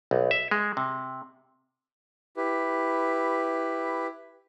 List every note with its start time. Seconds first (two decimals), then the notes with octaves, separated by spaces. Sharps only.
0.11 B1
0.31 E5
0.51 G#3
0.77 C3
2.37 E4 G4 B4